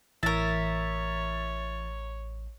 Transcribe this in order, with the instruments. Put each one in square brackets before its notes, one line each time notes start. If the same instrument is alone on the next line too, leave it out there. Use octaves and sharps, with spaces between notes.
[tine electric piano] A1 [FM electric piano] E3 A6 [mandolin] A#4 E5 [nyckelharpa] C#5